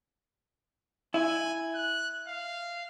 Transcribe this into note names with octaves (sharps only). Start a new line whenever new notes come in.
E4 G#5
F#6
F5